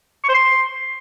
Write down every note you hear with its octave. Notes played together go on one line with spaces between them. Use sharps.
C#6
C5
C6